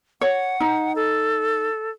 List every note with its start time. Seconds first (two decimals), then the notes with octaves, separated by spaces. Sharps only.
0.21 C#5 F#5
0.60 D#4
0.96 A4